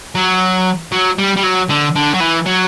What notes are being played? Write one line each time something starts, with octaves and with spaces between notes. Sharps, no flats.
F#3
F#3
G3
G3
F#3
D3
D3
F#3
E3
F#3